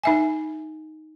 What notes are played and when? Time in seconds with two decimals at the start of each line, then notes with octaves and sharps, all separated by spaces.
0.03 D#4 E5 G#5